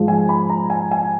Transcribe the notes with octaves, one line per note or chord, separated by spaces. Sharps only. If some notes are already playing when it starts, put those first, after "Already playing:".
Already playing: G#2 F3 G#3
G#5
B5
A#5
G#5
G#5